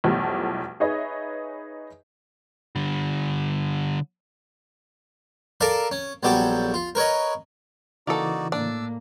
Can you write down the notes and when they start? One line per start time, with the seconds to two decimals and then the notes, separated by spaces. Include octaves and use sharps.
0.04 B1 E2 F3 G3 A3
0.80 D#4 G#4 B4 C#5 D#5 E5
2.76 D3 G3
5.61 A4 A#4 D5 F5 A5
5.91 C#4
6.23 A#1 F#3 G3 B3 G4 A4
6.74 F4
6.95 A#4 B4 C#5 D#5
8.07 C#3 E3 A#3 D#4 F#4 A4 D5
8.52 A2 A#3 D4 E6